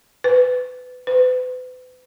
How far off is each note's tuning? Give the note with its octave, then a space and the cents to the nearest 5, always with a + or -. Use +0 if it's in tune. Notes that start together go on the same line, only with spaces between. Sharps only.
B4 +25
B4 +40